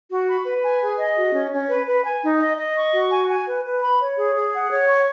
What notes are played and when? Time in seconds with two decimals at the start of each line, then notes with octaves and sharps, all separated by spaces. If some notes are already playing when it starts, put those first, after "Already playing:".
0.11 F#4
0.28 B5
0.45 B4
0.63 G#5
0.81 G#4
0.99 D#5
1.16 F#4
1.34 C#4
1.52 C#4
1.69 B4
1.87 B4
2.05 G#5
2.23 D#4
2.41 D#5
2.58 D#5
2.76 C#6
2.94 F#4
3.11 G#5
3.28 G#5
3.47 B4
3.65 B4
3.82 B5
3.99 C#5
4.17 G#4
4.35 G#4
4.53 F#5
4.70 C#5
4.88 C#6